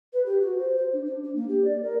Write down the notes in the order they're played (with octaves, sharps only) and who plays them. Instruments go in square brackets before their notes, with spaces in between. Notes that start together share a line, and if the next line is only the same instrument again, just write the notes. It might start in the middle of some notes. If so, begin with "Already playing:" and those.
[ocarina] B4
G4
F#4
C5
C5
D4
D4
D4
A#3
G4
D5
A#4